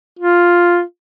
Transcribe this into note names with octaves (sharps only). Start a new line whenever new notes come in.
F4